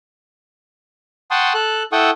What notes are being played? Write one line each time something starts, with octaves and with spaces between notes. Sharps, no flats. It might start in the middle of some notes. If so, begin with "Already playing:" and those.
F#5 G5 A5 C6 C#6 D#6
A4 F#6
E4 A4 F#5 G5 C#6 D#6